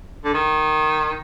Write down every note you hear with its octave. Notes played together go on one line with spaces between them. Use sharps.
D3
D#3